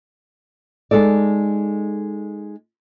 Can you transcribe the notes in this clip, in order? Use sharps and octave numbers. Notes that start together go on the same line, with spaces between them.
G#3 D#4 A4 D5